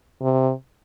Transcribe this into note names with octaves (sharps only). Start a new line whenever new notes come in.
C3